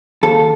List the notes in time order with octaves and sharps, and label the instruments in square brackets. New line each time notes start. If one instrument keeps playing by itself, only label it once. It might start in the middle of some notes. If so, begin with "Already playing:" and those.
[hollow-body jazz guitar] D#2 A4